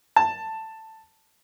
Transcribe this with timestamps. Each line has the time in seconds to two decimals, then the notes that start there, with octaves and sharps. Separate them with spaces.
0.16 A5